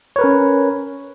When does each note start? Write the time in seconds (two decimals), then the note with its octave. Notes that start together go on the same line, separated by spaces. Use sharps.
0.16 C#5
0.19 B4
0.21 A#4
0.24 C#4